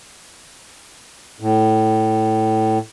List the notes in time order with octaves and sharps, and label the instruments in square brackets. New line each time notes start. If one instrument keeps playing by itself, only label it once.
[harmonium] A2